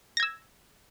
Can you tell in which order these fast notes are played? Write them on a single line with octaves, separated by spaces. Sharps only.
A#6 G#6 E6